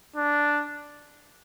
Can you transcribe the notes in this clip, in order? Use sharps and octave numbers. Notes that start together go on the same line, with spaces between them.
D4